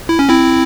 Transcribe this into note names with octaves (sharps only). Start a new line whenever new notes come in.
E4
C#4
C4 E4